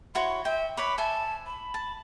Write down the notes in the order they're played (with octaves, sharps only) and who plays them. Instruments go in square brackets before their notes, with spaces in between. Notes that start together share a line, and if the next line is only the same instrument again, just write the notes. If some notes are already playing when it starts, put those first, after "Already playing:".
[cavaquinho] E4 F#4 C#5 [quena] C6
[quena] E5 [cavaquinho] G5
[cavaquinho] B4 C#5 B5 [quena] D6
[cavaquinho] C5 E5 G#5 [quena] A5
[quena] B5
[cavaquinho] A5